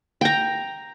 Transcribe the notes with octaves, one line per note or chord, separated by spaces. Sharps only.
G5 A#5